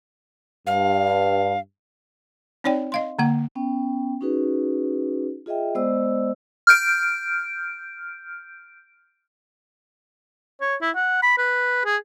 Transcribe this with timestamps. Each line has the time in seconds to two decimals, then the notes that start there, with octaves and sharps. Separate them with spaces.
0.67 G2 F5
2.64 C4 D#4 C#5 D5 G5
2.92 D#5 F5 C6
3.19 D3 A#3 F#5
3.55 B3 C#4 G5
4.21 C#4 D#4 F#4 G#4 B4
5.46 F4 G#4 D#5 E5 G5
5.75 G#3 B3 C5 D5 D#5 E6
6.67 F6 G6 D7
10.61 C#5
10.81 E4
10.96 F#5
11.23 B5
11.38 B4
11.85 G#4